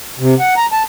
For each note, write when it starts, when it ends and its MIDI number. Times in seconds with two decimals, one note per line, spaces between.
0.19 0.35 48
0.39 0.54 78
0.57 0.66 82
0.72 0.83 81